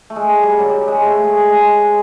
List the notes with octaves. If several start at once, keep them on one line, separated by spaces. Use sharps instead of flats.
A3
G#3
G3
F#3
G3
G#3
A3
G#3
G#3